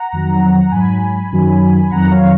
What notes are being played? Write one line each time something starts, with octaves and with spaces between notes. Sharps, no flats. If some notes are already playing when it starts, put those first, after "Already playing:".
Already playing: F#5 A#5
F2 D#3 F#3
A#5
G#2 F#3 G#5 B5
F#2 D#3 F#3
F2 D#3 F#3 F#5 A#5
C#5 F5